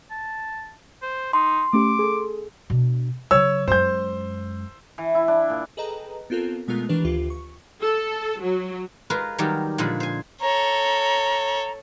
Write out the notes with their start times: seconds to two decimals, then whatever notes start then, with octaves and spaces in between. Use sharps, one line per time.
0.11 A5
1.02 C5
1.33 D#4 C6
1.73 A3 C#4 G4 D6
1.99 G#4 A4
2.70 B2 D4
3.31 C#3 F#3 C#5 E6
3.68 F#2 G#3 C5 G6
4.98 E3
5.15 E4
5.28 D4
5.50 A#2
5.77 G#4 A4 B4 D#5 G5 A#5
6.30 B3 C4 F4 A4 A#4
6.68 B2 G#3 A3 B3 F4 A#4
6.89 D#3 E3 D4 G4 A#4 B4
7.04 D2 F4 G4 B4
7.30 C#6
7.81 A4
8.42 F#3
9.10 G#3 F4 A#4 B4
9.38 D#3 F#3 G3 G4 A#4
9.78 A#2 D3 F3 G#3 B5
10.00 C5 G#5
10.41 A4 C#5 A#5